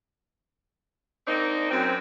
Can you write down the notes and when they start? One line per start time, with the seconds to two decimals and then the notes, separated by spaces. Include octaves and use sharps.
1.27 A#3 C4 D4 D#4
1.71 F#2 C4